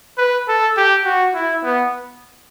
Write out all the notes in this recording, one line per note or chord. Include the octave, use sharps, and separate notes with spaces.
B4
A4
G4
F#4
E4
B3